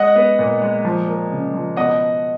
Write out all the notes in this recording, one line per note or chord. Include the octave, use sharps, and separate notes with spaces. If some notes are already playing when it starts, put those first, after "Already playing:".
Already playing: G#3 D#5 F#5
B3
A#2
G#3
F3
A#3
C#3
F3
B2 D#5 F#5